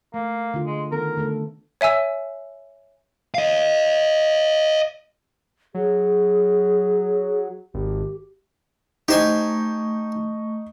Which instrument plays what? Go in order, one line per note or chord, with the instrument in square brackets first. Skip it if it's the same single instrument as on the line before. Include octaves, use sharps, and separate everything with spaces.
[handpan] A3 [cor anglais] A#3
[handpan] D3 F4
[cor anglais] G#3
[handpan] D#3 B3 A4 [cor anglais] A#4
[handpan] D3 A3 A4
[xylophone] C#5 E5 G#5 E6
[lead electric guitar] D#5 F5
[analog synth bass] F#3 [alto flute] G#4
[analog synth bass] G#1 [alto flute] G4
[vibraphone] A3 C#6 [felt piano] D#4 [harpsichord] G4 C5 G#5